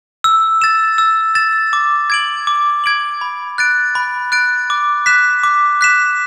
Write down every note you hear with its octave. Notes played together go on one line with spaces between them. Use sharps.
E6
A6 E7
E6
A6 E7
D6
G#6 D7 F#7
D6
G#6 D7 F#7
B5
F#6 A6 D7
B5
F#6 A6 D7
D6
F#6 B6 E7
D6
F#6 B6 E7